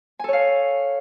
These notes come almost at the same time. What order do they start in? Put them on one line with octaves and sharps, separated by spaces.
G#5 A4 C#5 F5